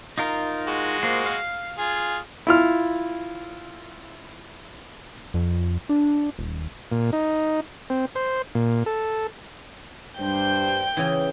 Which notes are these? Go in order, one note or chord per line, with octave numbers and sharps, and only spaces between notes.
D#4 F4 A#4
G#3 F#4
A#3 F4 C5
F5
F4 G#4
E4 F4 F6
F2
D4
D#1
A#2
D#4
C4
C5
A#2
A4
G2 D4 C5 G5
C#3 E3